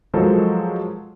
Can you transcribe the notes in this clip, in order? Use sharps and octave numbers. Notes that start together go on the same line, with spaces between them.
F3 F#3 G#3 A4 A#4 C5